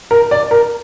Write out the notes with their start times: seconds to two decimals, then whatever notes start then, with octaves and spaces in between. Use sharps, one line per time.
0.11 A#4
0.31 D5
0.51 A#4